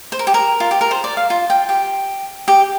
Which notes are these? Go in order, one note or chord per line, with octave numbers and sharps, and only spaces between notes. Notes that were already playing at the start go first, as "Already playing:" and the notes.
C5
A#4
G4
A#4
F4
G4
A#4
C5
D5
F5
F4
G5
G4
G4